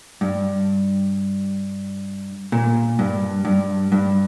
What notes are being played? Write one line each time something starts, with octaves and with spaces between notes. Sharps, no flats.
G2
A#2
G2
G2
G2